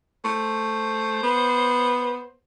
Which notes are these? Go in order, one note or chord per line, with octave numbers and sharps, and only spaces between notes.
A3 C5
B3